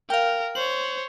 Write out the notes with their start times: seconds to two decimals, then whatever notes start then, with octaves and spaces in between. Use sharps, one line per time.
0.10 A#4 F5 G5
0.55 C5 C#5 F#7